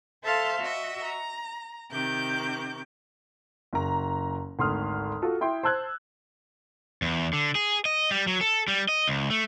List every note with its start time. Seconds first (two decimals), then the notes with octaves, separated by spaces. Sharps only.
0.24 A4 C5 E5 F5 A5 C6
0.61 F#4 D#5 E5
1.03 A#5
1.91 C3 D#3 D6 G6
3.73 F#1 A#5
4.59 G#1 D2 C6 D#6 F6
5.22 F4 F#4 A4
5.41 E4 G5 C6
5.63 C5 A5 E6 F#6 G#6
7.02 E2
7.33 D3
7.55 G#4
7.85 D#5
8.11 G3
8.27 F#3
8.41 A4
8.68 G3
8.89 D#5
9.08 C#2
9.30 A3